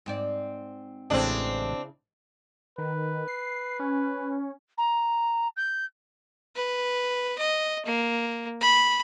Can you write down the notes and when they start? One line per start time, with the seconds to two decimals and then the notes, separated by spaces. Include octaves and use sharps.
0.06 G#2 C4 D5
1.10 A1 C#3 G#3 C4 D4 E4 D#5
2.78 D#3 B4
3.28 C7
3.79 C#4
4.78 A#5
5.56 G6
6.55 B4
7.38 D#5
7.86 A#3
8.61 B5